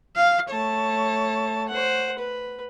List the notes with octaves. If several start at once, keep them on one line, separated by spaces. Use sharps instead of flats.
F5
A3 C#5 A5
C5 F#5
B4